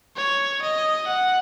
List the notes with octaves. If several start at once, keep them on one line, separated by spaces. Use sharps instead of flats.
C#5
D#5
F#5